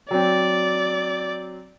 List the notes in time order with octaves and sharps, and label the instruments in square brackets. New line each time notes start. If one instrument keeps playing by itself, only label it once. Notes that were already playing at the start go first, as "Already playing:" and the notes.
[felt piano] F#3 C4 [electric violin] D5